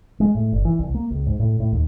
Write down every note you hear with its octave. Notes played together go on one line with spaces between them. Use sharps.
G#3
A2
G1
E3
C2
A#3
C#2
G#2
A2
A2
D#2